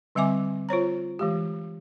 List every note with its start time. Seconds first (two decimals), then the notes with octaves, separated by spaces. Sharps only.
0.15 D3 G3 C4 E5 G#5 D6
0.69 F4 C5 C#5 A#5
1.19 E3 G#3 G4